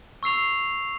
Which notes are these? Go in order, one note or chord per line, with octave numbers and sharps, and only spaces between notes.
C#6 E6 C7 F7